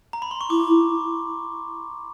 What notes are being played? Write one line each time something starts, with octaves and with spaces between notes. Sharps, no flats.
A#5
B5
C6
C#6
E4 D6